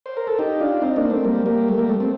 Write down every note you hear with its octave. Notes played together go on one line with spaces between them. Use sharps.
C5
A#4
A4
D#4 G4
D4 F4
C4 D#4
A#3 D4
A3 C4
G3 A#3
G3 A#3
A3
G3 A#3
A3
A3 C4